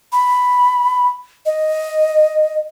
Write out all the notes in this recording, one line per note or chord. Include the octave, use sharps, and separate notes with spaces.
B5
D#5